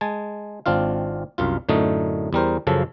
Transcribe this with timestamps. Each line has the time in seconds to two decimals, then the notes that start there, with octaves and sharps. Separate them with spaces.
0.01 G#3 G#5 A5
0.66 G#1 C4 D4 F4 F5
1.38 C2 F#2 F4
1.69 F#2 A2 D3 A3 D#4
2.33 E2 G3 A#4 C5
2.67 F#2 C#3 F3 A4